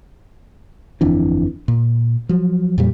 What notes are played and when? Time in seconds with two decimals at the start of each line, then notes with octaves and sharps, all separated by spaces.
1.01 G1 F2 E3 D4
1.68 A#2
2.29 F3 F#3
2.78 F2 A#2 G3